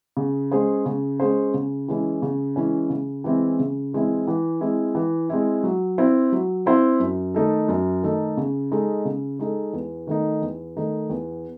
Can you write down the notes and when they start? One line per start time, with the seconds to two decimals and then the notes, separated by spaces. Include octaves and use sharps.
0.17 C#3
0.51 G#3 C#4 G#4 C5
0.86 C#3
1.20 G#3 C#4 G#4 C5
1.54 C#3
1.88 E3 G#3 C#4 E4
2.22 C#3
2.56 E3 G#3 C#4 E4
2.90 C#3
3.24 E3 G#3 C4 E4
3.59 C#3
3.93 E3 G#3 C4 E4
4.27 E3
4.61 G#3 C4 E4
4.95 E3
5.29 G#3 C4 E4
5.63 F#3
5.98 C4 E4 C5
6.32 F#3
6.66 C4 E4 C5
7.00 F#2
7.34 D#3 A3 D#4 A4
7.68 F#2
8.03 D#3 A3 D#4 A4
8.37 C#3
8.71 G#3 D#4 A4
9.05 C#3
9.39 G#3 D#4 A4
9.73 E2
10.07 D#3 A3 D#4
10.42 E2
10.76 D#3 A3 D#4
11.10 E2